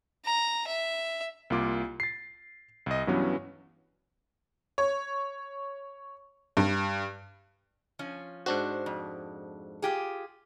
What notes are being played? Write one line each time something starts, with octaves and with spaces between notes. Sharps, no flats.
A#5
E5
C2 A#3 F4 D6
A6 C7
C2 D#5
G2 E3 F#3 B3 C#4
C#5
G2
F3 C#4
G#2 D4 F#4 C5
F2
F4 G4 G#4